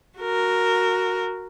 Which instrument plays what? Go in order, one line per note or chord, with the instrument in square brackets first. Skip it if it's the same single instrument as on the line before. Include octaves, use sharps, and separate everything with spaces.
[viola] F#4 A#4